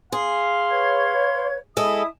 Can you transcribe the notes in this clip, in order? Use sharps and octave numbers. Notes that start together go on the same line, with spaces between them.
G#4 F5 C6
B4 C#5 G#6
G#3 E4 A4 E5 D#6